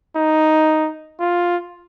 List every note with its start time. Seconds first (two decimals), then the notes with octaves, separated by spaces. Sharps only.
0.16 D#4
1.20 F4